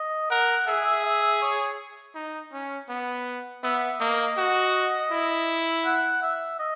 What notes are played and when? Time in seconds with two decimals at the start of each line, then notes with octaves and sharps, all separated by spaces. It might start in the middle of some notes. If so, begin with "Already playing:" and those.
Already playing: D#5
0.30 A#4 F#5
0.67 G#4 E5
0.86 E5
1.05 E5
1.22 E5
1.42 C#5
2.15 D#4
2.53 C#4
2.89 B3
3.64 B3 E5
4.00 A#3 D#5
4.37 F#4
5.11 E4
5.85 F#5
6.22 E5
6.59 D#5